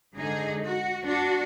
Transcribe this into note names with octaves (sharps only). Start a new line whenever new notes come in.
G#2 D3 D#4 G#4
F#4
D4 F#4